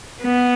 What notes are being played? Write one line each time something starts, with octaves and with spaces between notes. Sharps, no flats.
B3